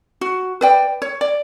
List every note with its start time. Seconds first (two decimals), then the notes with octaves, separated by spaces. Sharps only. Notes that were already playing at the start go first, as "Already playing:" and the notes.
0.21 F#4
0.61 B4 D5 G5
1.02 C#5
1.21 D5